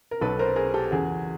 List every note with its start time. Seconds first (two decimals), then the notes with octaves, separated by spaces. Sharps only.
0.11 A#4
0.21 B1 B2 A4 B4
0.39 A#4 C5
0.56 G#4 A#4
0.74 G4 A4
0.91 F#1 E2 C#3 F#4 G#4